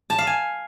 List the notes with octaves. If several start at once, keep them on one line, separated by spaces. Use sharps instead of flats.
A5
F5
G#5